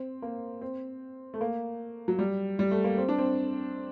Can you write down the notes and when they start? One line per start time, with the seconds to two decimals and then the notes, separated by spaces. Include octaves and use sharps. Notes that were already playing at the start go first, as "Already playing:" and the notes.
Already playing: C4
0.22 A#3
0.61 C4
1.34 A3
1.41 A#3
2.08 F#3
2.19 G3
2.59 G3
2.71 A3
2.84 A#3
2.97 C4
3.09 D4
3.18 C4